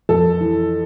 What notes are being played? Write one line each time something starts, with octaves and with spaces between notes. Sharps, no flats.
F2 A4
E3